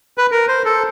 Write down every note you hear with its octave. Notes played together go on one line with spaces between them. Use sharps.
B4
A#4
C5
A4